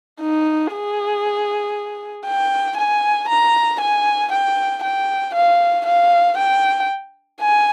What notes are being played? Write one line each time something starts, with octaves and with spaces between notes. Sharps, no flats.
D#4
G#4
G5
G#5
A#5
G#5
G5
G5
F5
F5
G5
G#5